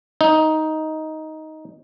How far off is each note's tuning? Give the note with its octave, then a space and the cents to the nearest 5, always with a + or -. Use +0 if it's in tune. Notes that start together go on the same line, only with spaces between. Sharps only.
D#4 +10